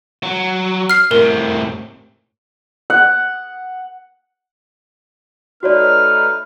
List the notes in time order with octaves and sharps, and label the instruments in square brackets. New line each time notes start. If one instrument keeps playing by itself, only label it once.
[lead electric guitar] F#3
[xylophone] F6 C7
[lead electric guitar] A2 C3 [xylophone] A#4
[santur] F#5
[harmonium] A3 D#4 B4 [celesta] F#4 C#5 D5 [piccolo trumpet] F6